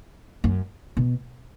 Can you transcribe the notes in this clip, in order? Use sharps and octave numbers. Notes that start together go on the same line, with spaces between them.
F#2
B2